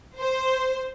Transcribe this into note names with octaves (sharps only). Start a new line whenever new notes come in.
C5